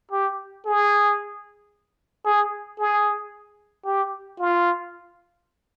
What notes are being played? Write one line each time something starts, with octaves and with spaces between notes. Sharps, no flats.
G4
G#4
G#4
G#4
G4
F4